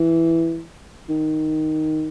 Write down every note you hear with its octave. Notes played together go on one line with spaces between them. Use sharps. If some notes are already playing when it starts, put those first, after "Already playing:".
Already playing: E3
D#3